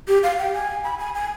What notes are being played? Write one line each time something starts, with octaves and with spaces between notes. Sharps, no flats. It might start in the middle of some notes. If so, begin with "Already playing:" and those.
G4
F5
G5
G#5
B5
G#5
G#5